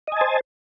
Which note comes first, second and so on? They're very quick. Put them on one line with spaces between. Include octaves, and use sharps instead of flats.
D#5 G#5 A5 C5